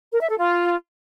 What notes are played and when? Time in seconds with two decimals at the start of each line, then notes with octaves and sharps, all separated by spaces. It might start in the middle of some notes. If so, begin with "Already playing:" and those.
0.13 A#4
0.21 E5
0.29 A4
0.38 F4